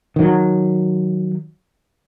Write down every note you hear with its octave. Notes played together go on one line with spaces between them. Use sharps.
D#3 F#3